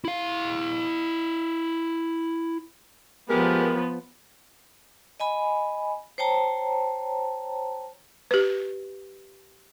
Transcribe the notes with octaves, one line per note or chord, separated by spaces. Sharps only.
E4 F5
F3 G#3 B3 G4 A#4
D#5 G#5 B5
C5 C#5 G5 A5 A#5
G4 B4